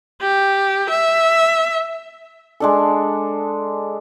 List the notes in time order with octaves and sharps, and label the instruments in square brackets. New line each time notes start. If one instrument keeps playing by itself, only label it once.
[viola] G4
E5
[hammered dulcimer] G#3 D4 A4